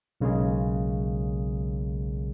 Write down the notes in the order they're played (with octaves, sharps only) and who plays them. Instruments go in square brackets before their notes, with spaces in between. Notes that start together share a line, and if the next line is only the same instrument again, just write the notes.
[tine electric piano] B1 C#3 G#3 A#3 G#4